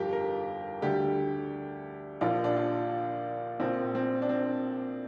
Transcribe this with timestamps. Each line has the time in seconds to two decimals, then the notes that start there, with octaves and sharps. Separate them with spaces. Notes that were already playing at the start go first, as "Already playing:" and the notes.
Already playing: G1 F2 F3 F4 G4 A#4
0.13 A#4
0.82 D2 D3 G3 G4
2.21 A#1 A#2 F3 F4
2.44 D4
2.56 F4
3.60 A#1 A#2 F3 C4
3.95 C4
4.22 D4
4.29 C4